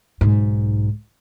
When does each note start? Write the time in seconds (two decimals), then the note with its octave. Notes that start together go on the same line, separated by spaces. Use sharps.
0.21 B1 G#2